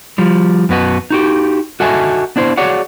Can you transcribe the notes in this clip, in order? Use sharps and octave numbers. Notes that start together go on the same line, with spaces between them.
F3 G3
F#2 B3 F#4 B4
D#4 F#4 G4
F#4 A4 D#5 E5 G#5 A5
B3 D4 E4 C5
F#4 G#4 C#5 D5 F#5